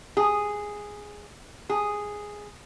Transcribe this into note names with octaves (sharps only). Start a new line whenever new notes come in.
G#4
G#4